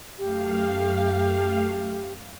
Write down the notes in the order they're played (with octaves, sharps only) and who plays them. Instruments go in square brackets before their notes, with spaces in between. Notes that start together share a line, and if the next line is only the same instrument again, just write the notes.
[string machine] F#2 A3 F5 [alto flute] G4